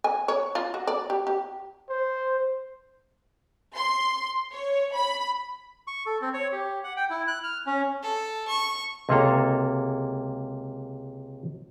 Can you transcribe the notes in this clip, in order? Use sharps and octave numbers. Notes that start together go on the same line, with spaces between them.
G#5
C#5
F4
F#4
D5
G4
G4
C5
C6
C#5
B5
C#6
A4
C4
C#5
G4
F#5
G5
E4
F#6
F6
C#4
A4
C#6
C#2 C3 A#3 G#4 A4 A#5